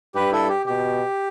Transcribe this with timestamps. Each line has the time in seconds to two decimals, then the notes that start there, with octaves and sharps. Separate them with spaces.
0.15 G2 G4 B4
0.32 E4 A4
0.49 G4
0.66 B2 G4